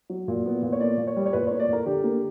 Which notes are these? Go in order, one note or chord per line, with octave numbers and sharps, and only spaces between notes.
F#3
A#2
B3
A#2
C#5
A#3 D5
A#2
C#5
G3
C#5
A#2 B4
A#3 C#5
D5
A#2 A#4
D3 G4
A#3